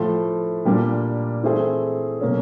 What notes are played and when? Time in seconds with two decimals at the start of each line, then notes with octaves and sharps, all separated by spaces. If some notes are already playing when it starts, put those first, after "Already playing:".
Already playing: A2 F3 A3
0.65 A#2 G3 A#3 D4 G4
1.43 E3 A3 C4 E4 G#4
2.21 B2 F#3 A#3 C#4